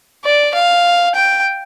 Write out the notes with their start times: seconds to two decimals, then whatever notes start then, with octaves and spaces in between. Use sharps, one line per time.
0.24 D5
0.54 F5
1.15 G5